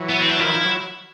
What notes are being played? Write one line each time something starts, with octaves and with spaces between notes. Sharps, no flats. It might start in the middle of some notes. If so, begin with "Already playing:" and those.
Already playing: E3 F#3
B3
C4
D4
D#3 F3 E4
F3
F#3